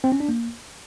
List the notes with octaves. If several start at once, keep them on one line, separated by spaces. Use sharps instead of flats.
C4
C#4
D4
A#3